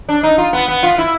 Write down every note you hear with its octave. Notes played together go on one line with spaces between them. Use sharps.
D4
D#4
F4
B3
B3
F4
E4